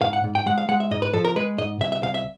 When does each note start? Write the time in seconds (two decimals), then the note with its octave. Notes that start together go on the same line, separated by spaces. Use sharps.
0.01 G#2 F5
0.13 F#5
0.24 G#2
0.35 G5
0.46 G#3 F#5
0.58 F5
0.69 G#3 F#5
0.80 E5
0.91 G#2 D#5
1.02 B4
1.13 F3 A4
1.25 A#4
1.36 G#3 B4
1.58 G#2 D#5
1.81 C2 E5
1.92 E5
2.03 C2 F5
2.14 E5